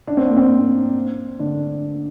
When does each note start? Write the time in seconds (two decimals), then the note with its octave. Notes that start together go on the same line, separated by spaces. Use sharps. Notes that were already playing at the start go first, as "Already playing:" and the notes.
0.07 D4
0.17 C4
0.27 A#3
0.37 C4
1.39 D3 D4